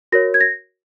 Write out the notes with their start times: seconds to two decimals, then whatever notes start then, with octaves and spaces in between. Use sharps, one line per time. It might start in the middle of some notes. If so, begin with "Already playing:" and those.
0.12 F#4 A#4 C#5 A#6
0.34 G#6
0.41 A#6